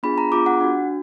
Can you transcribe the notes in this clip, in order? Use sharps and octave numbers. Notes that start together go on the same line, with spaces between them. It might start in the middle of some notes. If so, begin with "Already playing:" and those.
B3 D4 F4 G#4 B5
A#5
B3 D4 F4 G#4 D6
F#5
D4 F#4